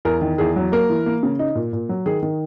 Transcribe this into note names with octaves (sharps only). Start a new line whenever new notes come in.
E2 A#4
D#3
E2 G#4
F#3
A#3 A#4
E3
A#3
C#3
D#4
A#2
A#2
F#3
D#3 G#4
D#3